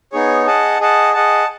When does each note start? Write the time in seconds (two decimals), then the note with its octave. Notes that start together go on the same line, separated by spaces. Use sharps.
0.12 B3 D#4 G#4 C#5
0.46 G#4 D#5 F#5 A5
0.80 G#4 D#5 F#5 A5
1.13 G#4 D#5 F#5 A5